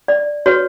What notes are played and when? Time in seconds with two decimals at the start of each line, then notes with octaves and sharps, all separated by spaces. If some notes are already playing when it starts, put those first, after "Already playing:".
0.08 D5
0.46 F#4 B4 C#5